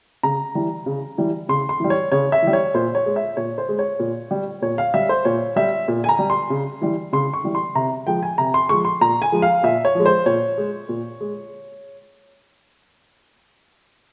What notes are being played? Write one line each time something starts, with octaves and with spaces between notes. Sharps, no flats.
C#3 A#5
E3 G3
C#3
E3 G3
C#3 C6
C6
E3 G3
C#5
C#3 C#5
E5
E3 G3
C#5
A#2 C5
C#5
G#3
E5
A#2 C#5
C5
G#3
C#5
A#2
G3
A#2 C#5
F5
G3 E5
C5
A#2 C#5
G3 E5
A#2
G#5
A#5
G3
C6
C#3
E3 G3
C#3 C6
C#6
E3 G3
C6
C3 A#5
F3 G#3 G5
G#5
C3 A#5
C6
F3 G#3 C#6
C6
A#2 A#5
G#5
F3 G#3
F5
A#2 E5
C#5
F3 G#3
C5
A#2 C#5
G#3
A#2
G#3